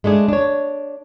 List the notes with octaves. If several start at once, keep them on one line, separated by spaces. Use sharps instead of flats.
G#3 A3 D4 G#4
D4 C#5